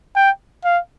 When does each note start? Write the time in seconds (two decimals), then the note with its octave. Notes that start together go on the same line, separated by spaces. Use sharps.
0.16 G5
0.64 F5